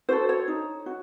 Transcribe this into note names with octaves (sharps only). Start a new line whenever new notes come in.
F#4 A4 C5
C#5
D#4
F#4